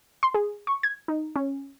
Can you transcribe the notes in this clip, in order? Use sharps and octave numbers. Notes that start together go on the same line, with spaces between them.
C6
G#4
C#6
G#6
D#4
C#4